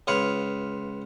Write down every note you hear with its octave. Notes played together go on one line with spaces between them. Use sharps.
C#2 F4 B4 C#5